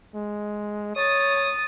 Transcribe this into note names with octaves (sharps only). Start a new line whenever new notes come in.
G#3
C#5 D#6 A6